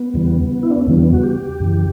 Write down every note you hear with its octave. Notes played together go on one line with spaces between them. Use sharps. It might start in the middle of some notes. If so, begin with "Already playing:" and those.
Already playing: B3
E2 C#3 E3 G3
E4
D4
C#4
E2 C#3 E3 G3 B3
F#4
G4
F#2 C#3 E3